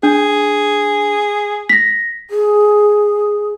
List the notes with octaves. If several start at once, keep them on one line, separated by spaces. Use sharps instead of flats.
D4 G#4
A#6 B6
G#4